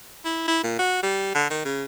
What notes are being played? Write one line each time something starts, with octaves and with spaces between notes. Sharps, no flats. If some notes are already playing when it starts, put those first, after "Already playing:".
E4
E4
A#2
F#4
G3
D3
D#3
C#3